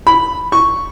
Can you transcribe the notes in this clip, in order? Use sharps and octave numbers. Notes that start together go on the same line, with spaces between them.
B5
C#6